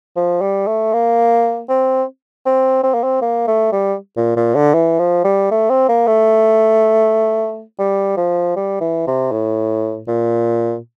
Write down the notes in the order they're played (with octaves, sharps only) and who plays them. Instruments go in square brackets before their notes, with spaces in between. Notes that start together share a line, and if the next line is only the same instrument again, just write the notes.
[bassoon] F3
G3
A3
A#3
C4
C4
C4
A#3
C4
A#3
A3
G3
A#2
A#2
D3
E3
F3
G3
A3
C4
A#3
A3
G3
F3
G3
E3
C3
A2
A#2